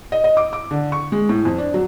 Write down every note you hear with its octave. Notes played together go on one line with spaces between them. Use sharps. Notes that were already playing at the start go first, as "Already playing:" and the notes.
D#5
D#5
D6
D6
D3
C#6
G#3
A2
F2
D4
F#3